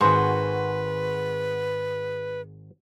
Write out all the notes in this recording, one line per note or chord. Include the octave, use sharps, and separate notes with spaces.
G#1 G#2 F#4 G#4 B4 C5